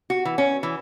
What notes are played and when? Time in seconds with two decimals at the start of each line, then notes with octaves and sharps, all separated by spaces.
0.10 F#4
0.25 E3
0.38 C#4
0.63 E3